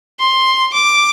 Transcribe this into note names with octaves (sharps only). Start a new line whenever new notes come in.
C6
D6